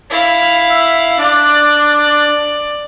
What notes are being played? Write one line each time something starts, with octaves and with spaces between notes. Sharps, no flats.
E4 F5
E5
D4 D5